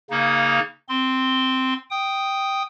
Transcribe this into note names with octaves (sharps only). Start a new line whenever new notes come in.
C#3 A#3 D#4
C4 C6
G5 D#6